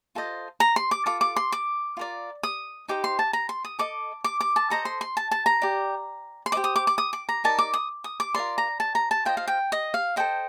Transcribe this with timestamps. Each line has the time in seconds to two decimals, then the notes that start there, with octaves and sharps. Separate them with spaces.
0.15 F4 A4 C5 D#5
0.60 A#5
0.76 C6
0.91 D6
1.06 F4 A4 D6
1.21 D6
1.36 C6
1.52 D6
1.97 F4 A#4 D5
2.43 D#6
2.88 D#4 G4 C5 D6
3.04 C6
3.19 A5
3.33 A#5
3.49 C6
3.65 D#6
3.79 A4 D#5 D6
4.24 D6
4.41 D6
4.56 A5
4.70 A4 C5 D#5 A#5
4.85 C6
5.01 C6
5.17 A5
5.31 A5
5.46 A#5
5.62 G4 D5
6.46 C6
6.52 G4 C5 D#5 D6
6.64 D#6
6.76 D6
6.87 D6
6.98 D#6
7.13 D6
7.29 A#5
7.44 D#4 A#4 D5 A5
7.59 D6
7.74 D#6
8.04 D#6
8.20 D6
8.34 F4 A#4 D5 C6
8.58 A#5
8.80 A5
8.95 A#5
9.11 A5
9.25 F4 C5 D#5 G5
9.37 F5
9.48 G5
9.72 D#5
9.94 F5
10.16 A4 C5 D#5 G5